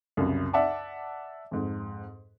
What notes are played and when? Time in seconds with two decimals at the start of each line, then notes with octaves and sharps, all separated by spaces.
0.17 C2 F#2 C#3
0.53 D5 E5 F#5 A5 D6
1.51 F2 G#2